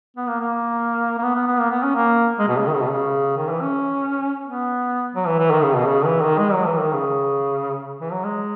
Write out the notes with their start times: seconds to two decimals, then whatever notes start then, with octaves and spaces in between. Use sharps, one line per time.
0.17 B3
0.28 A#3
0.40 A#3
1.18 A#3
1.23 B3
1.35 B3
1.47 B3
1.59 A#3
1.71 B3
1.83 C#4
1.95 A#3
2.39 G#3
2.48 B2
2.57 C#3
2.66 D#3
2.74 C#3
2.82 B2
2.90 C#3
3.37 D#3
3.49 E3
3.62 C#4
4.44 B3
5.15 F#3
5.27 E3
5.39 E3
5.51 D#3
5.63 C#3
5.76 B2
5.87 C#3
6.05 E3
6.23 D#3
6.39 G#3
6.53 F#3
6.66 E3
6.80 D#3
6.93 C#3
8.01 E3
8.12 F#3
8.24 G#3